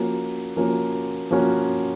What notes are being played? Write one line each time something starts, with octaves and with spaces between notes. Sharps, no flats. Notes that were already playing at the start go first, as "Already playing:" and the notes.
Already playing: F3 A#3 C#4 F#4
F3 A#3 C#4 F#4
F3 A#3 C#4 F#4